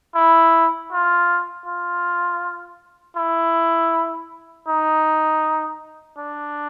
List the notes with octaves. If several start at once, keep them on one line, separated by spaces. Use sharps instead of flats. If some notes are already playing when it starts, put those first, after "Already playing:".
E4
F4
F4
E4
D#4
D4